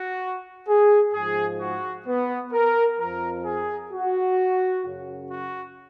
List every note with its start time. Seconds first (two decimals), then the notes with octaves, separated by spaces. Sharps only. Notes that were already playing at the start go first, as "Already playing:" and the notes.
Already playing: F#4
0.68 G#4
1.14 G#2 F3 G#4
1.60 F#4
2.07 B3
2.53 A#4
3.00 F2 F3 A#4
3.45 G#4
3.92 F#4
4.85 F#2 C#3 F#3
5.31 F#4